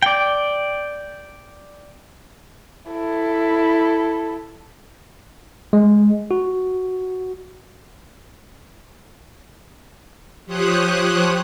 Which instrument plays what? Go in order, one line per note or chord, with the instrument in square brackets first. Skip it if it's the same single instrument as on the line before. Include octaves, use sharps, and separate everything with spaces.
[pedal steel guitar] D5 G5
[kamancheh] E4 A4
[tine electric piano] G#3
F#4
[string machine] F3 G4 C5 C#5 D#6 F#6